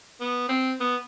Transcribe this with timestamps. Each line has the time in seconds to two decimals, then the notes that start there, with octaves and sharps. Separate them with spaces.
0.21 B3
0.49 C4
0.81 B3